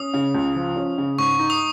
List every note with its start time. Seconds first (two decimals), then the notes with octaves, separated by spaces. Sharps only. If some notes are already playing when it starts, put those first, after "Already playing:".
Already playing: C#4 D#6
0.14 C#3
0.35 C#2
0.56 F3
0.76 C#4
0.98 C#3
1.18 G#2 C#6
1.39 D#4
1.50 D#6